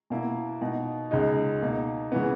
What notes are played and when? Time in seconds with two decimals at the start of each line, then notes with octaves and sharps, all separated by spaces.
0.10 B2 A#3 E4
0.61 B2 A#3 D#4
1.11 C#2 C#3 G#3 D#4
1.62 B2 A#3 D#4
2.12 C#3 E3 B3